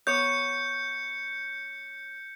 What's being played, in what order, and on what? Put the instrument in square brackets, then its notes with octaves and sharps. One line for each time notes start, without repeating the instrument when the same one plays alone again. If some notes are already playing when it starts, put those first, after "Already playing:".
[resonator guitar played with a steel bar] B3 C#5 [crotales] G6 C#7